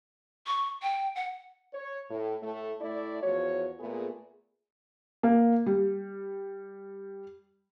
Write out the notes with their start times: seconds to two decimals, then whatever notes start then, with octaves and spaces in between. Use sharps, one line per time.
0.47 C#6
0.82 G5
1.16 F#5
1.74 C#5
2.10 A2
2.42 A2 A3
2.81 A2 A3 E4 D5
3.22 E2 F3 F#4 C#5
3.79 A#2 A3 B3 G#4
5.23 A#3
5.66 G3